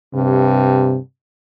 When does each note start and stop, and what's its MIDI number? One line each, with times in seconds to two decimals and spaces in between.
0.15 0.99 43
0.15 0.98 48